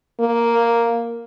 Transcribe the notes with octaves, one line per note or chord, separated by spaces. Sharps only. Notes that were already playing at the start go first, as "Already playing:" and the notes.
A#3